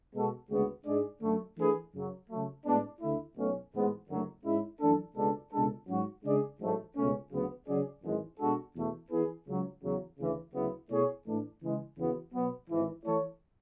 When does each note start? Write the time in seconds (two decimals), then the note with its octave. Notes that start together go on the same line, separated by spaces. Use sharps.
0.14 B2 G#3 B3 F#4 A4
0.50 D2 C#3 G#3 B3 F#4
0.86 G#2 G#3 D4 G#4 D5
1.22 F#2 D3 A3
1.58 E3 A3 D4 G#4 B4
1.93 F#2 C#3 F#3
2.30 C#3 F#3 A3
2.66 A2 G#3 B3 D4
3.01 D2 D3 A3 E4
3.37 B1 B2 A3 C#4
3.73 A1 G#2 G#3 B3
4.08 F#1 F#2 D3 F#3 A3
4.45 G#2 G#3 C#4 E4
4.80 F#2 E3 A3 D4 A4
5.16 C#2 B2 G#3 D4 A4
5.52 C#2 B2 G#3 D4 A4
5.88 G#2 F#3 C#4 F#4
6.25 C#3 G#3 D4 G#4 D5
6.60 A1 G#2 F#3 A3
6.96 C#2 B2 A3 C#4
7.31 D2 C#3 F#3 B3
7.67 C#3 F#3 C#4 G#4 D5
8.04 G#1 F#2 E3 G#3
8.39 B2 G#3 D4 F#4 A4
8.75 E2 B2 A3
9.11 E3 B3 E4 G#4 B4
9.46 C#2 C#3 F#3 C#4
9.83 E2 C#3 F#3
10.18 D2 C#3 E3
10.54 D2 C#3 F#3 B3 E4
10.90 B2 A3 E4 G#4 C#5
11.26 A2 E3 A3 D4
11.62 C#3 E3 G#3
11.98 E2 C#3 E3 B3 F#4
12.34 B2 F#3 B3
12.70 G#1 G#2 E3
13.05 E3 A3 E4 A4 C#5